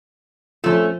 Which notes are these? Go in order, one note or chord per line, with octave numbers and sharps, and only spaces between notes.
F3 A3 C#4 F4